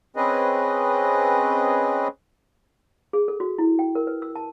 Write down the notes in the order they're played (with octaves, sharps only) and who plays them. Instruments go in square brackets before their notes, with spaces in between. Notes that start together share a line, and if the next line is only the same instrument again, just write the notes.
[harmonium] C4 C#4 G#4 B4 D#5
[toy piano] G#4
A4
F#4
E4
G5
A#4
B4
E6
A5